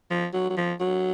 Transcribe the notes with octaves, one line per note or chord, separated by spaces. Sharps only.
F3
F#3
F#3
F3
F#3